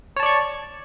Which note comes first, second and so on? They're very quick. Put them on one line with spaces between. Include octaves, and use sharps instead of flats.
C#5 A5 D5 C#6